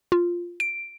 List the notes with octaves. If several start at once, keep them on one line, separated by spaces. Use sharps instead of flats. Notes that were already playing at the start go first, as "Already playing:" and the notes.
F4
D7